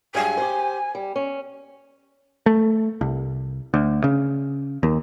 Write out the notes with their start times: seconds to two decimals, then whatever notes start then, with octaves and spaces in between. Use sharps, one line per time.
0.15 G2 F#3 G#3 G#5
0.37 G4 C5
0.95 G3
1.16 C#4
2.46 A3
3.01 C2
3.74 D2
4.04 C#3
4.83 D#2